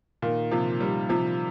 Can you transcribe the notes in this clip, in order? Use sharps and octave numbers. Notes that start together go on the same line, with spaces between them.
A#2 D#3
C3 F3
D#3 G3
C3 F3